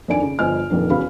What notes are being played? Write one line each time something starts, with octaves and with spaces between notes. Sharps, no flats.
F2 D#3 D4 D5 G#5 D7
C#3
G1 F3 D#5 G#5 F6
F1 A#1 F2 D#3 D4
E1 E2 C#3 F#4 F5 B5